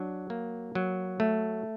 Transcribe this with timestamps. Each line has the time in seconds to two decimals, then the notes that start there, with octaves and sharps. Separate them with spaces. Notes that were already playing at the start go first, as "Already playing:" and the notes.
Already playing: F#3 D4
0.30 A#3
0.75 F#3
1.20 A3